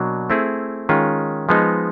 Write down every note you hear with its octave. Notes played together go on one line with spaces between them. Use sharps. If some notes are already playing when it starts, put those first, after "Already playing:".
Already playing: B2 F#3 A#3 D4
A3 C4 E4 G#4
D#3 G#3 C#4 F4
F3 G#3 B3 D#4